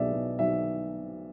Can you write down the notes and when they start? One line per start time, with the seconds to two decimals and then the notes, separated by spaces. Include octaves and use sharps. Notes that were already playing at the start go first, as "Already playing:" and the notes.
Already playing: B1 B2 D5 E5
0.13 B2
0.39 B1 E5